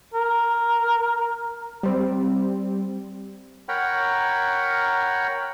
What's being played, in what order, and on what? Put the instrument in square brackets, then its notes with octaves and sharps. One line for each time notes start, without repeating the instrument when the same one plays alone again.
[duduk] A#4
[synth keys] G3 C4
[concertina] A#4 C#5 F#5 G5 A#5 B5